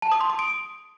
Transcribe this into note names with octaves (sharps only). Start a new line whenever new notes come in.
A5
D#6
C6
D#6
D7